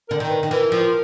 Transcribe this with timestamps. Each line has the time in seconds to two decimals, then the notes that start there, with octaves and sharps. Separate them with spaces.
0.09 D3 A#4
0.20 D#3
0.30 B4
0.43 D#3
0.51 E3 A#4
0.72 F3